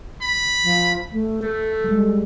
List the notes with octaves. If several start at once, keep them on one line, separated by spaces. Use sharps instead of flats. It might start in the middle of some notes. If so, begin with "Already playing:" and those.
B5
F3
A3
A3 A4
G3 G#3